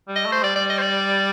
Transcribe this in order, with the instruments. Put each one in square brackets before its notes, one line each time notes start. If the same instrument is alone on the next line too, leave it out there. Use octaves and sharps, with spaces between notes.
[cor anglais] G3
[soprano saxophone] D#5
[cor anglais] A3
[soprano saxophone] C5
[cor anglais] G3 [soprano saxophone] D5
[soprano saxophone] D5
D#5
C5
D5